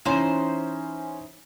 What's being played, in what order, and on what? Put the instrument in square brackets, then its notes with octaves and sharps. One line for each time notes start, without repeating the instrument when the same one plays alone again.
[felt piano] E3 C#4 [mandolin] D#4 E4 C5